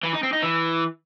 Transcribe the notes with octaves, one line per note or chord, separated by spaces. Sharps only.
E3
D#4
C4
D#4
E3